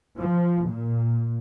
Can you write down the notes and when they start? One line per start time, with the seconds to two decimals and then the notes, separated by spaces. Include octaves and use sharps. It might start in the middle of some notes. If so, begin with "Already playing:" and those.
0.18 F3
0.67 A#2